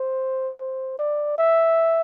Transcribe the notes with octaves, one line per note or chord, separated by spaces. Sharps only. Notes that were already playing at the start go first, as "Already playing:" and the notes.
Already playing: C5
C5
D5
E5